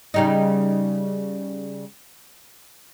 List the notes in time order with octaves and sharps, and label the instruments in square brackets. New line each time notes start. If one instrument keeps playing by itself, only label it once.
[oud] C#3 G3 D#4